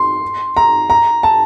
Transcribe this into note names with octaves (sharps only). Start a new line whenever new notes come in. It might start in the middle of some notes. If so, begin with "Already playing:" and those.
Already playing: C6
A#5
A#5
A5